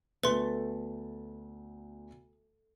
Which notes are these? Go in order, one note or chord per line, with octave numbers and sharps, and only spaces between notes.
D2 A3 B3 B4 C6